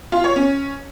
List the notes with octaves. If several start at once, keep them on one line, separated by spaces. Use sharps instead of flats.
F4
C#5
C#4